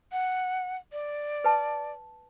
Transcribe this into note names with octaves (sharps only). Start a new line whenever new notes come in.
F#5
D5
B4 A5